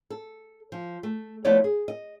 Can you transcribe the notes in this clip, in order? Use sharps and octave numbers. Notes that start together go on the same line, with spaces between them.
A4
F3
A3
F3 A3 B3 E4 C#5 D5
G#4
D#5